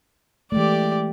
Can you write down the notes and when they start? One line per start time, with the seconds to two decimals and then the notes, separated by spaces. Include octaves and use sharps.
0.52 E3 G#3 A3 G4 D5